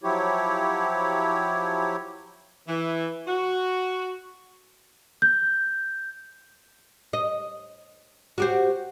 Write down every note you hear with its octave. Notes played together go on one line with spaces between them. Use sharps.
F3 F#3 E4 G4 C#5
E3
F#4
G6
D#5
F#4 G4 C5